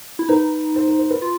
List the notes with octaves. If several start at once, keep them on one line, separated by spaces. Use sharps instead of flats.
E4
D#4 B4
C5
C5
C5
B4
F4